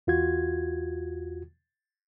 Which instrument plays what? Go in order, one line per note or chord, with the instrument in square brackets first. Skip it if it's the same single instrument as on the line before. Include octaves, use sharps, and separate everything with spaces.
[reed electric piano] E2 F4 F#4 G#6